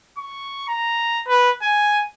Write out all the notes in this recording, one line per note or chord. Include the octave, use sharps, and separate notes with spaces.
C#6
A#5
B4
G#5